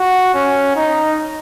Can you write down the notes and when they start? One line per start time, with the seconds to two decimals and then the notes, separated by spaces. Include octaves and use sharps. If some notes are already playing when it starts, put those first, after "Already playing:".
Already playing: F#4
0.34 C#4
0.76 D#4